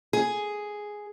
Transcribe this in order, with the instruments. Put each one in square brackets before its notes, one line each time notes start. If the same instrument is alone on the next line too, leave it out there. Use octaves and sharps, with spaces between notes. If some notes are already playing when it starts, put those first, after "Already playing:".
[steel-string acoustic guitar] G#4